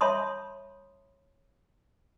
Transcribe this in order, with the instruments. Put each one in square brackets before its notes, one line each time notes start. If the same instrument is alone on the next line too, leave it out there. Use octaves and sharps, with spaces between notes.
[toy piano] C#5 E5 A5 B5 C6 D#6